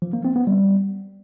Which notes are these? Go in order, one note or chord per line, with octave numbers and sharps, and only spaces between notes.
F3
A#3
C4
B3
G3